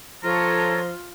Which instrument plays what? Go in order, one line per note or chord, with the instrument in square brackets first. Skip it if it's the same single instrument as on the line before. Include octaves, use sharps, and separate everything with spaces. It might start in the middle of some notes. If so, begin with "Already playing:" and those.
[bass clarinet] F3 [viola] F4 [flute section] A4 C#5 [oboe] A#5